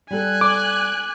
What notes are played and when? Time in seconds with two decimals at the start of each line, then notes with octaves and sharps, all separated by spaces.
0.11 G3 A4 G#5 F#6
0.41 D6